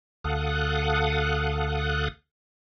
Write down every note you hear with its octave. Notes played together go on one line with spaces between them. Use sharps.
D2 A4 F5 F#5 D#6 F#6